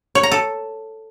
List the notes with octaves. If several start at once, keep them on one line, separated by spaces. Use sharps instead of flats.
C#5
A#5
A4